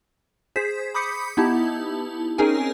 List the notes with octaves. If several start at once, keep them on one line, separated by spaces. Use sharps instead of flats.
G#4 C5 B6
B5 D6 D#6 G6 B6 C#7
B3 D#4 E4 G4 A5
C4 C#4 D#4 G#4 A#4 G#5